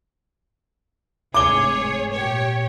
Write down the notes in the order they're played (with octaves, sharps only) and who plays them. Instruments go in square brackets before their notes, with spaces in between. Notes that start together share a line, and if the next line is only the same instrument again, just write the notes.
[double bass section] F1 G#2 [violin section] G#4 C#5 [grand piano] D6 G7
[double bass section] A#2 [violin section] G4 C#5